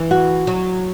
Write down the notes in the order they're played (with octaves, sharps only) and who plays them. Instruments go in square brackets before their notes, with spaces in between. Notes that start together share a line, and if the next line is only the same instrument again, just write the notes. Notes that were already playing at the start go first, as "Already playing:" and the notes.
Already playing: [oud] E3
[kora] F#4
[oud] F#3